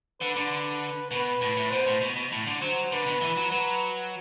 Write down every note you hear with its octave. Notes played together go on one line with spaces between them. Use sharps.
D3 B4
D3
B2 B4
A2
A2
B2 C5
A2
B2
B2
A2
D3
F#3 C5
D3 B4
B2
E3
F#3
F#3 B4